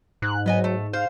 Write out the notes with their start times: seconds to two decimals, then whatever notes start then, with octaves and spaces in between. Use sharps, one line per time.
0.22 G#2 F#6
0.46 F#3 B3 D#5 G#5
0.64 A3
0.93 C5 F5